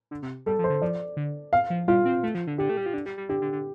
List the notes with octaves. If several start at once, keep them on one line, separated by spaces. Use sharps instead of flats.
D3
C3
G3 A4
F3
C5
D3
F3 D5
D3
F5
F3
G3 F4
C4
A3
F3
D3
D3 G4
A3
G3
F3
D3
G3
G3
D3 G4
D3
D3